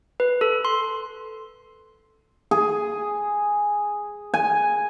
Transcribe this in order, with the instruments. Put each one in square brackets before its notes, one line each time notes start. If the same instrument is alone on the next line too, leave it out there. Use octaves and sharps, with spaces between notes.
[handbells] B4
A4
C6
[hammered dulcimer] G#4
G#5